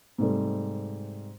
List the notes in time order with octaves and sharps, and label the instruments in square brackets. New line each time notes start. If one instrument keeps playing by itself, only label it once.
[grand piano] G#2 C3 G3 A3